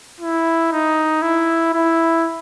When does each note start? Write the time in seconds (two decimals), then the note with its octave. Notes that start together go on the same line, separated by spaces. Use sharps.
0.20 E4
0.72 D#4
1.22 E4
1.73 E4